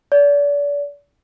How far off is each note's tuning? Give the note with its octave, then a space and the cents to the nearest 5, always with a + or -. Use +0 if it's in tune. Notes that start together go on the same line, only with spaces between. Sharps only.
D5 -35